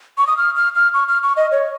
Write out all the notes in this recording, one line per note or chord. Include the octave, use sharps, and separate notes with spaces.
C#6
D#6
F6
F6
F6
C#6
F6
C#6
D#5
C#5